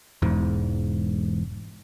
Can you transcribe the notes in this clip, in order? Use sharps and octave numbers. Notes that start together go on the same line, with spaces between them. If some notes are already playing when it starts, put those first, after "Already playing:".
E1 E2 G#2